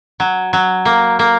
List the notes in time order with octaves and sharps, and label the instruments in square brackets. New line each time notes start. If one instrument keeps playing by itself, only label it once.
[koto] F#3
F#3
A#3
A#3